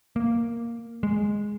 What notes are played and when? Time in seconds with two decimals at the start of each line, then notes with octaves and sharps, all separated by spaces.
0.16 A#3
1.03 G#3